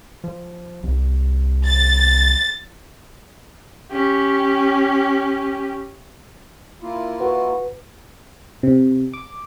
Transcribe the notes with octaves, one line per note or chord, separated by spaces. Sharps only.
F3
C2
A6
C#4 G4
A#3 E4 F4
F#4 B4
C3
D6